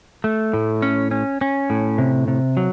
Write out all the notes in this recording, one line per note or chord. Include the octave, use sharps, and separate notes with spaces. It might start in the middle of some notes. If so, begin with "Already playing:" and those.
A3
A2
C#4
C#4
C#4
A2
C3
C3
F#3